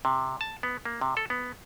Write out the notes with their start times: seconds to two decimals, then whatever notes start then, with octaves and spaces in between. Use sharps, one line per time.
0.05 C3
0.41 A5
0.63 B3
0.85 A#3
1.01 C3
1.17 A4
1.30 B3